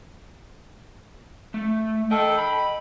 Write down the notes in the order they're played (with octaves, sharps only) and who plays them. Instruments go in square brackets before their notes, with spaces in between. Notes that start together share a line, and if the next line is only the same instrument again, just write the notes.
[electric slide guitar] A3
[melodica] A4 [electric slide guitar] D#5 G5
[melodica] B5